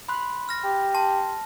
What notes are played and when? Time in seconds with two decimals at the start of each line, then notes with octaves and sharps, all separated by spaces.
0.08 B5 C6 F#6
0.49 F6 A#6
0.64 G4
0.95 A5 C6